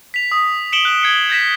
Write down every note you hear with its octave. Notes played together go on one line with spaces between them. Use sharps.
B6 F7
D#6
C#7 D7 E7 F#7 G7
F#6 D7
G#6 C7 C#7
G6 G#6 A#6 B6 E7